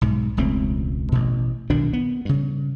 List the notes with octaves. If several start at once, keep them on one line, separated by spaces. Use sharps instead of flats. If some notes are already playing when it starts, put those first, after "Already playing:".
B1 G#2
E1 C#2 A3 C4
A1 B2
B1 B2 D#3 D4
B3
G2 C#3